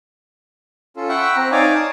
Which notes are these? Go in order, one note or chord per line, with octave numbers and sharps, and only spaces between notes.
C#4 F4 A4
E5 F#5 G5 B5 C#6
C4 A#5
D#4 C#5 D5 F5 G#5 D6
A5 D#6